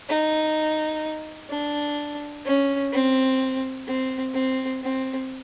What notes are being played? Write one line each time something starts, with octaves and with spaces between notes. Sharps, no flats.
D#4
D4
C#4
C4
C4
C4
C4